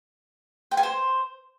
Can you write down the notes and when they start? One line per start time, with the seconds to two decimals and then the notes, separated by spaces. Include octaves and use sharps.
0.71 G5
0.77 G#5
0.83 C5